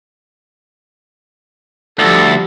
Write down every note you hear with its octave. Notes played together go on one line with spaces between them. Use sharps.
D2 F3 G3 A4